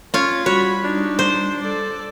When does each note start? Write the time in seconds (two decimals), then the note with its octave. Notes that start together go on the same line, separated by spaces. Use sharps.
0.14 C#4 F4 C#5
0.46 G3 F#4 C#5 B5
0.84 D4 D#4
1.19 C5
1.60 A4 D5